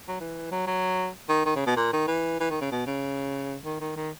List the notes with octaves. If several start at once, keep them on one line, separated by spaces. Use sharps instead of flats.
F#3
E3
F#3
F#3
D#3
D#3
C#3
B2
A#2
D#3
E3
E3
D#3
C#3
B2
C#3
D#3
D#3
D#3